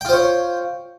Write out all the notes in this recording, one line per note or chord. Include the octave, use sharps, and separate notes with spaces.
F4 C5 C#5 G5